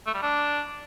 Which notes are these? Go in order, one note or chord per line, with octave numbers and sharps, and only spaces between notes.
A3
G3
D4